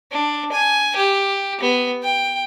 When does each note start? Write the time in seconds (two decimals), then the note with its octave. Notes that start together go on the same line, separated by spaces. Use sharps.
0.12 D4
0.52 G#5
0.96 G4
1.61 B3
2.03 G5